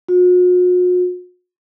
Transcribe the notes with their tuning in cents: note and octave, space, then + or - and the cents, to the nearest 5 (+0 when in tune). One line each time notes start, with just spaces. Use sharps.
F#4 -45